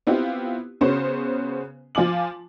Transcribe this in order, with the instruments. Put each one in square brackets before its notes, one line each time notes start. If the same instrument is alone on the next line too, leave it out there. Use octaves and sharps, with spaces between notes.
[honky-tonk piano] B3 C4 E4 F4 G4
C#3 B3 C#4 F#4 C5
F3 F4 G#5 D6 F#7